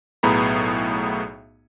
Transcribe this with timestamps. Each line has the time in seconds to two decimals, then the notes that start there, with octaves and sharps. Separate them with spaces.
0.23 B1 A2 B3 G#4 A#5 B5